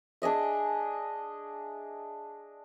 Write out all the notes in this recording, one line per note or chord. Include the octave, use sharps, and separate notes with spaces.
D4 G#4 D#5 E5